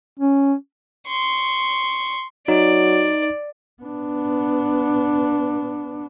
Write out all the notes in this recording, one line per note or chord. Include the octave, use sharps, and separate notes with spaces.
C#4
C6 C#6
F#3 D#4 D5
B3 D4